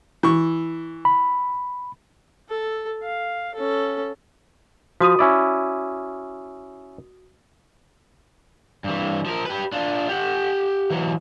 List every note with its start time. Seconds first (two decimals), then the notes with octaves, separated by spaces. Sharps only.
0.23 E3 C#6
1.05 B5
2.48 A4
3.03 F5
3.54 C#4 A4
5.01 F3 F#4 D#6 D#7
5.19 C#4 E4 D5
8.84 G2 E3
9.26 F3 A#4
9.46 G4 B4
9.72 D4 F4
10.09 G4 F#5
10.90 E3 F#3